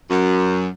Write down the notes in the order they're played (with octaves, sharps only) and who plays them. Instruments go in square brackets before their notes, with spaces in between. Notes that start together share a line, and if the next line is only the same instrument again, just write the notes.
[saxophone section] F#2